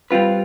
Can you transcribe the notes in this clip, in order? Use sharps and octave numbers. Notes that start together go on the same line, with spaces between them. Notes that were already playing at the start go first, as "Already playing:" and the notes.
G3 C4 F4 B4